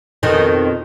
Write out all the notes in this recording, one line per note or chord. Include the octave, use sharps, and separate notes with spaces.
F2 B2 D#3